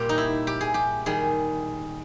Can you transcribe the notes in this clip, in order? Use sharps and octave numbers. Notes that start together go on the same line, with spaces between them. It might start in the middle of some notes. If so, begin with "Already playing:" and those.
Already playing: A#2 G3 G4
D#4
E4
G4
G#4
G4
D#3 G3 G#4